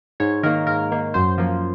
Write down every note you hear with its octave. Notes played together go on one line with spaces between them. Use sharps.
G#2 C#5
D#3 A#3 A#4
G#2 A#4
D#3 A#3
F#2 C5
F3 A#3